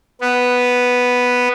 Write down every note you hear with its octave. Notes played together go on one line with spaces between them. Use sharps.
B3